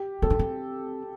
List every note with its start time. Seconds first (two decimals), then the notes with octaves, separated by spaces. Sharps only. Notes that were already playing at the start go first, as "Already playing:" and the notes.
Already playing: G4
0.22 C4 A4
0.30 D4
0.39 C4